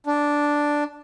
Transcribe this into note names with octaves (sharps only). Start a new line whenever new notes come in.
D4